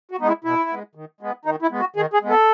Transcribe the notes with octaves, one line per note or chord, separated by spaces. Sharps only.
F#4
G#3 B3 D#4
E4
B2 E4
G#3 B3
D#3
G#3 B3
D#3 D#4
E4
G#3 B3
F#4
D#3 G#4
G#4
G#3 B3
A4